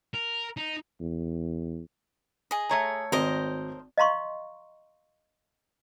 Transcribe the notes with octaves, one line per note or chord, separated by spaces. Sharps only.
A#4
D#4
E2
G#4 D#5
A3 C#5 A#5
G#1 A#4 C5 D#5
D#5 F5 A#5 C6 C#6